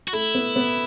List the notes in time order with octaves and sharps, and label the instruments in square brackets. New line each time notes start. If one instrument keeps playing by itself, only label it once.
[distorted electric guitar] F#4
[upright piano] A3 [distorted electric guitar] E4
[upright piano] B3
B3